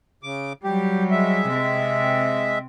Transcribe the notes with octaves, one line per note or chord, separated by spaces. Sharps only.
C#3 D6
F#3 G3 G4
G#3 E5
C3 C4